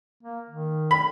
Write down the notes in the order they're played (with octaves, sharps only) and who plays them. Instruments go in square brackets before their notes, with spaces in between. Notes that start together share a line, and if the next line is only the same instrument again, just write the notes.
[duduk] A#3
D#3
[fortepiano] B5